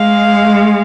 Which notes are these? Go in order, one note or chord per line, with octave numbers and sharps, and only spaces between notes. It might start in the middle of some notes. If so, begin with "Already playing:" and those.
Already playing: G#3 F5